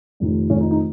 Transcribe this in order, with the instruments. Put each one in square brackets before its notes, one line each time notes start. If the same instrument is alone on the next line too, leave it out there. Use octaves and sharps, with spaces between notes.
[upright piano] F1 F2 D#3
F1 F2 D#3 C#4
D#4
D#4